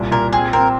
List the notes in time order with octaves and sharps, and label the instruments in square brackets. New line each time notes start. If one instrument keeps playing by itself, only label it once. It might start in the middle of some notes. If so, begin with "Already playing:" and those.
Already playing: [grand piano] C2 A#2
[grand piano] A#2 [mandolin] A#4
[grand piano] C4 [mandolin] G#4
[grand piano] C4 [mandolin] A#4